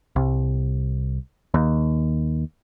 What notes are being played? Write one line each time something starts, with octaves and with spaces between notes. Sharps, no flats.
C2
D#2